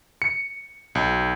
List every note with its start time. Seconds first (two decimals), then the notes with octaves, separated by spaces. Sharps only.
0.22 C#7
0.95 B1